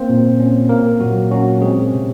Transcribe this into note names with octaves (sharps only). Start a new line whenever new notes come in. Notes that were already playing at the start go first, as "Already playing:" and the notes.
Already playing: A#3 C4 C5
A#2
C#4
A#3 A#4
A#2 F#3 F#4
F#3 C#4 F#4
G#3 C4 G#4
C3